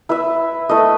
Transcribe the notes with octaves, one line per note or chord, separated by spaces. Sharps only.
E4 B4 E5
A3 E4 B4 D#5